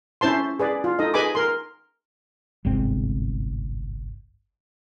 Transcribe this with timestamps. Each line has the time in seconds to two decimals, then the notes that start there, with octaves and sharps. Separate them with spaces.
0.21 C#4 E4 C5 A5 C6
0.59 G#4 B4 D5
0.84 F4
0.99 D#4 A4 D#5
1.14 G#4 B4 D#5 G#5 B5 D6
1.35 A#4 C6
2.65 G1 C2 G#2 C4